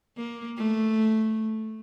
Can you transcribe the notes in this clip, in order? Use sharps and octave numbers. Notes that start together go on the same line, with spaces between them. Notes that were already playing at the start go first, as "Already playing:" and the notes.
A#3
A3